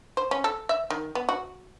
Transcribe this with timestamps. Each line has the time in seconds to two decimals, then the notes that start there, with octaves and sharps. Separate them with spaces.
0.17 C5
0.31 C#4
0.44 A4
0.69 E5
0.90 D#3
1.15 B3
1.29 F#4